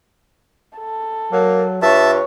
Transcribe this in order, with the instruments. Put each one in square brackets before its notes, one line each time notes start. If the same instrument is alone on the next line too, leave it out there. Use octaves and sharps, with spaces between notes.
[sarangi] A4
[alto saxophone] F#3 [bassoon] A#3
[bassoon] G2 [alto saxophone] F4 [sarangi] C#5 [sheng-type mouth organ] E5 A5